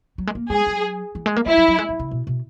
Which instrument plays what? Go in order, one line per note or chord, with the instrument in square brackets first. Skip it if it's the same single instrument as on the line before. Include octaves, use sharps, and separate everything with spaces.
[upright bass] F#3
G#3
A#3
[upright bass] G#3 [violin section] G#4
[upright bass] F#3
E3
G#3
A#3
[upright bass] G#3 [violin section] E4
[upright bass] F#3
F#3
G#3
F#3
C#3
B2
B2